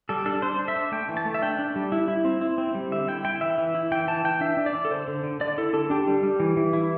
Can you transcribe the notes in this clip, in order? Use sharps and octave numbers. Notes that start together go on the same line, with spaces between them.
G3 A4
D4 A4
D4 C5
D4
E5
D4
A3 G5
E3
A5
A3
E5
D4 G5
D4
G3
E4
E4
C4
E4
C4
G3
D3 E5
E4 G5
E4 G5
E3 E5
E3
E4
E3 G5
E3 A5
E3 G5
D4 E5
D4
D5
E3
A4
D3 C5
D3
D3
D3 D5
E4 A4
D3 A4
D4 G4
G3
G3
E3
E3
E4